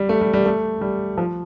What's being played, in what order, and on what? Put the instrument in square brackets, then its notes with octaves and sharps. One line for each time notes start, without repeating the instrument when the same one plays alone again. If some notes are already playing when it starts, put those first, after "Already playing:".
Already playing: [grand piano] G3
A3
G3
G3
A3
G3
F3